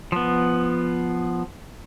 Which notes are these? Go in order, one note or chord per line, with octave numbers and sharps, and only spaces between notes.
F3 B3